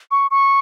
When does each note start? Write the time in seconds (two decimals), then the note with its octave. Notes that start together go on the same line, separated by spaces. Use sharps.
0.11 C#6
0.31 C#6